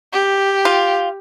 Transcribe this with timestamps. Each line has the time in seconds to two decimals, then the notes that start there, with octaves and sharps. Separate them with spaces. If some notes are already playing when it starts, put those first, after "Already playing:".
0.13 G4
0.65 F4